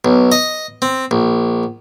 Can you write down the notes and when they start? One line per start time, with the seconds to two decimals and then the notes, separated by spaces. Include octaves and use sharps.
0.05 B1
0.32 D#5
0.82 C4
1.11 A#1